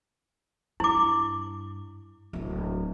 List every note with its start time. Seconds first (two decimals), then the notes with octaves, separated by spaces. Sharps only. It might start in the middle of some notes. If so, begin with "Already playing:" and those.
0.80 G2 E4 D6
2.33 D1 A#2